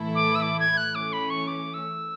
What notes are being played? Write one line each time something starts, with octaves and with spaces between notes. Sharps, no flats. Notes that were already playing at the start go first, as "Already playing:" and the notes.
Already playing: A2 E3 A3 E4 A4
D6
E6
D6
G#6
F#6
E3 A3 C#4 D6
B5
C#6
D6
E6